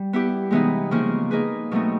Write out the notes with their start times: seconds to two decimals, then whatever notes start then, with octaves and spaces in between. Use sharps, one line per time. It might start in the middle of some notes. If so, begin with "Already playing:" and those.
Already playing: G3
0.13 B3 E4 G4
0.51 C3 E3 G#3 B3 D#4
0.91 C#3 F3 A#3 D#4
1.31 A#3 D#4 G#4 B4
1.71 B2 F#3 A3 C4 D#4